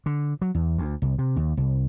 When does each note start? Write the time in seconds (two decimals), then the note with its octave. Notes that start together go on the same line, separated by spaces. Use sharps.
0.06 D3
0.42 F#3
0.55 E2
0.78 D2
1.02 C2
1.18 C3
1.36 D#2
1.57 C2